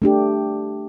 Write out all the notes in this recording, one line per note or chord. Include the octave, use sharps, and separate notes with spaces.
A3 D4 G4